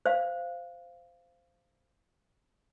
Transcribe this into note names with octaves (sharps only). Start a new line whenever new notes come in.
C5 F5